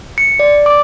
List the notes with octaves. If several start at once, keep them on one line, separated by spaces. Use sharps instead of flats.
C#7
D5
D6